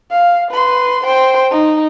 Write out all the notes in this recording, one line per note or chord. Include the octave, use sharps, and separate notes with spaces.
F5
B4 C6
C5 G5
D#4